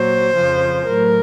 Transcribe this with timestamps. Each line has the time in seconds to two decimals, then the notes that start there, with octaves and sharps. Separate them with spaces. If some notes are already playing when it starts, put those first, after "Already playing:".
Already playing: A#2 F#3 C5
0.36 F2 C#3 F3
0.88 A2 F#3 A#4